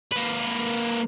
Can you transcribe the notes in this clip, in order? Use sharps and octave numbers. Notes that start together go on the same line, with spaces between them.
A#3 B4